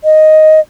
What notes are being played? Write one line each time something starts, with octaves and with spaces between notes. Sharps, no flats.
D#5